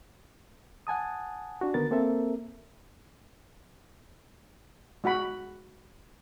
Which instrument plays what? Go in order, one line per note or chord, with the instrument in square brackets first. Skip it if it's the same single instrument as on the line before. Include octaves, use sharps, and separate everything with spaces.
[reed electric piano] F#5 G#5 A5 D#6
D4 F#4
D3 D#3 B3 A#4 A6
A#3 C4 A4 A#4 E5
[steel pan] G#3 F#4 F#5 B5